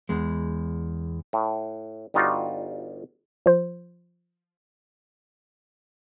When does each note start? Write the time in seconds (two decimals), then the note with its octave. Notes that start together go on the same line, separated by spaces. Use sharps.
0.09 E2 G#3
1.33 A2
2.14 G1 G3 D#4 F4 F#4 D5
3.46 F3 C5